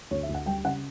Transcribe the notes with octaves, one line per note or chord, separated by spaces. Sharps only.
D2 C#5
E5
D2
F#5
G3 G5
C#3 F#5